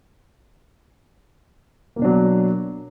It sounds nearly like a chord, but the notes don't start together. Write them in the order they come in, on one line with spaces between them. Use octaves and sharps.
A#3 B2 D4 F#3